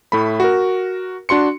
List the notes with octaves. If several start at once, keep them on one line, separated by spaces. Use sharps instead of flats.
A2 A3 B5
F#4 A#4
D4 F#4 C6 C#7